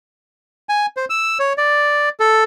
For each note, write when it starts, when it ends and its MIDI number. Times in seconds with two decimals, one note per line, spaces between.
0.69 0.86 80
0.97 1.05 72
1.10 1.38 88
1.39 1.53 73
1.58 2.09 74
2.20 2.44 69